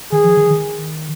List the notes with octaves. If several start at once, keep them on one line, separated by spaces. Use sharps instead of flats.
D#3 G#4
F3
D#3
D#3